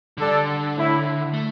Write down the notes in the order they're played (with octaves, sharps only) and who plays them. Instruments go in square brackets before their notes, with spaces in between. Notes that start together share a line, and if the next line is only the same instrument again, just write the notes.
[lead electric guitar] D3 [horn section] G3 D4 A4 D5
[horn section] A2 A3 E4
[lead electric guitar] A3